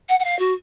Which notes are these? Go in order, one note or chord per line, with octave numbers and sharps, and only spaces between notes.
F#5
F#5
F5
F#4